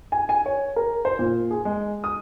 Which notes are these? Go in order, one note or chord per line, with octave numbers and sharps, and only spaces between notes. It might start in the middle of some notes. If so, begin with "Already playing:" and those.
G#5
G#5
C#5
A#4
C5
A#2
G#4
G#3
D#6